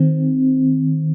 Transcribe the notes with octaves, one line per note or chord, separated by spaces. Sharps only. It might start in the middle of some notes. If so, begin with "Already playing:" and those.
Already playing: D#3 C4